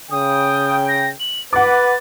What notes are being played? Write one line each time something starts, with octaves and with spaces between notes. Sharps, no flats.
C#3 G5 D#6
A#6
F#7
B4 F#5 D6 A6